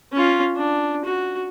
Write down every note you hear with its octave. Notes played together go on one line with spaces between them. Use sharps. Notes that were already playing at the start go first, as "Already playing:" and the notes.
C#4 F4
D4
F#4